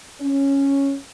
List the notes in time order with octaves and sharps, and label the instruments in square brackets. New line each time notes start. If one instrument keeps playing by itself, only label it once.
[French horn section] C#4